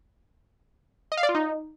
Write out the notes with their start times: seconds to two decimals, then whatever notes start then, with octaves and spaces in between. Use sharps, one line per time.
1.12 D#5
1.17 F5
1.23 D5
1.29 F4
1.35 D#4